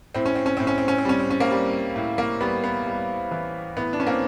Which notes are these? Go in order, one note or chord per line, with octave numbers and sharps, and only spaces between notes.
A2 C4
C#4
C4
C#4
A2 C4
C#4
C4
C#4
C4
G3 C#4
C4
C#4
A#3 C4
G3
A2
A#3
G3 B3
B3
G3
E3
A2 B3
D4
C#4
A#3 C4